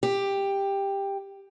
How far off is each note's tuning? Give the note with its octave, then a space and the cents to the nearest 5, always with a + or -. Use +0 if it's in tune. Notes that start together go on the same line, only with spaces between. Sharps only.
G4 +10